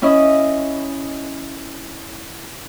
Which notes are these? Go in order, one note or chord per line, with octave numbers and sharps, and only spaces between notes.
C#4 E4 D#5